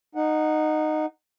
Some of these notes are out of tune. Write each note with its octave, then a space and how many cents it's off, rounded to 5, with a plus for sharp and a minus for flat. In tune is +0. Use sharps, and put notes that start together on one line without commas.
D#4 -15 F#5 -5